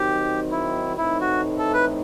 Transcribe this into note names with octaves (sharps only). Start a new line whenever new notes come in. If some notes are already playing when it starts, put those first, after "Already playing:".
Already playing: D#3 F#3 C4 D#4 G4
E4
A2 E3 A3 C4 D#4 E4
F#4
A4
B4